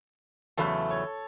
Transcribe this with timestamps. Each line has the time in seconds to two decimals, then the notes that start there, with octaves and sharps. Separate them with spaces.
0.58 E2 C#3 F#3 A3 A4
0.90 C#5